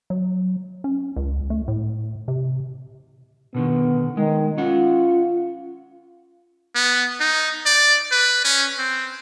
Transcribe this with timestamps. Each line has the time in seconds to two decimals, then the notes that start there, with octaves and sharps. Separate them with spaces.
0.10 F#3
0.84 C#4
1.16 C#2
1.50 A3
1.68 A2
2.28 C3
3.54 B2 D3 D#3 B3
4.17 D#3 G#3
4.58 C#4 F4 F#5
6.75 B3
7.20 D#4
7.66 D5
8.12 B4
8.45 C#4
8.79 C4